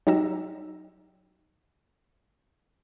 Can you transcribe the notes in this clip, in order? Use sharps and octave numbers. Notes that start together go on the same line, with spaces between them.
F#3 D#4 G4 A#5 E6